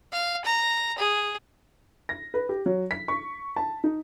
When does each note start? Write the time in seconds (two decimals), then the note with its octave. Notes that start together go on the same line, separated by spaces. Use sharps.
0.12 F5
0.45 A#5
0.98 G#4
2.09 A#6
2.34 B4
2.49 G4
2.66 F#3
2.91 B6
3.08 C#6
3.56 A5
3.84 D#4